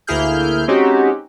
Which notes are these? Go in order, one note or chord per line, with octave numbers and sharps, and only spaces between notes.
D2 A#3 E4 G#4 F6 G6
G#3 C4 C#4 D#4 F#4 G4